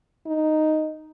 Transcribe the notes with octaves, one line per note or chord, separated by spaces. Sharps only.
D#4